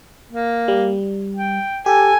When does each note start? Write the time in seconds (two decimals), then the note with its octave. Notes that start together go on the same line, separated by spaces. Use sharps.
0.30 A#3
0.68 G3
1.36 G5
1.86 G4 A4 G#5